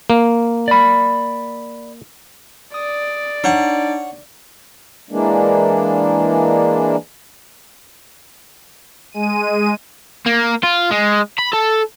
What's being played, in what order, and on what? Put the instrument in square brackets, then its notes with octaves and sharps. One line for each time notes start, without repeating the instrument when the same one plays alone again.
[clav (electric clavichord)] A#3
[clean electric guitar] D5 B5
[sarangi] D5 [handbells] D#6
[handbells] D4 D#4 [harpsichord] C#5 F#5 C#6
[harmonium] E3 G#3 A#3 D4
[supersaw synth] G#3 D#7
[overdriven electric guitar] A#3
F4
G#3
B5
A4